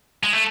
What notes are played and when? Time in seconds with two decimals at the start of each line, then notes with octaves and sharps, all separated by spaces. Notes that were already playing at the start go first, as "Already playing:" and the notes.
0.23 G#3
0.33 A3